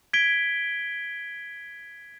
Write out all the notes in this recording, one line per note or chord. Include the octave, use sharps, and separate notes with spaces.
G#6 B6 D7 G7